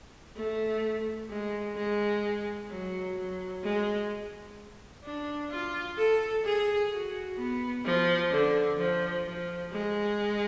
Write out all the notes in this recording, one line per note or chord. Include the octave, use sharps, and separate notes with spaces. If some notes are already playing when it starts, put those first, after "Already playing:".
A3
G#3
G#3
F#3
F#3
G#3
D4
F4
A4
G#4
F#4
B3
F3
D3
F3
F3
G#3